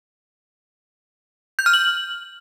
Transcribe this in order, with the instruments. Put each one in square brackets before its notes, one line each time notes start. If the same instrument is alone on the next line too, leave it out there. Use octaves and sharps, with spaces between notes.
[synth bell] G6
F6
F#7